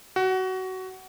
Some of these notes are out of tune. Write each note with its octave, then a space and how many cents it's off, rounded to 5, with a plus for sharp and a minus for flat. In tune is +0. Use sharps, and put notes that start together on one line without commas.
F#4 +20